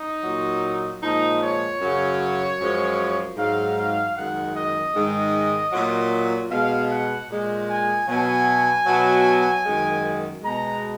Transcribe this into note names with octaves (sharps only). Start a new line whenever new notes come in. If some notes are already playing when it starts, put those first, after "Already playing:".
Already playing: D#4
A#2 F#3
A#2 F3 G#3 D#4
C#5
F#2 C#3 F#3
F#2 F3 G#3
G#2 F#3 F5
F5
F#2 D#3 G#3 F#5
D#5
G#2 D#3 G#3
A#2 F#3
B2 G#3 F5
F#5
A#2 G#3
G#5
B2 F#3 G#5
B2 F#3
F#2 D#3 G#3
B2 G#3 A#5